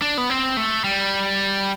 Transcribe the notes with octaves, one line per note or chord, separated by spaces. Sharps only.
D4
B3
C4
A3
G3